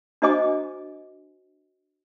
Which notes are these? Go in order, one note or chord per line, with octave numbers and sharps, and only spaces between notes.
D4 F#4 C5 D#5 G#5 D6